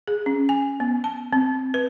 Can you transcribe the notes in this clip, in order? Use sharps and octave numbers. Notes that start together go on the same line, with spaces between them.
G#4
C#4
G#5
B3
A5
C4
B4